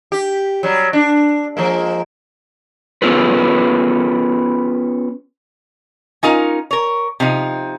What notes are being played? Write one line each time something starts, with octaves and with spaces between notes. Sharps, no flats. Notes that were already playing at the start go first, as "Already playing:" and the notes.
G4
F#3 G3
D4
F3 G#3 A#3
B3 C#4 F4 G#4 A4 B4
C#4 D#4 F4 A#4
A#4 C#5
C3 F3 D#4